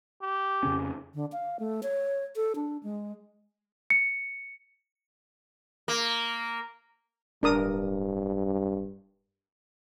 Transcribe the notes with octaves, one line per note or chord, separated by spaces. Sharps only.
G4
F2 C#3 C#4
D3
F5
A3
C#5
A4
D4
G#3
C#7
A#3
D1 G2 D4 A#4 D#6